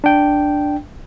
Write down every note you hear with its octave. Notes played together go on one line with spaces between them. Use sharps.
D4 G5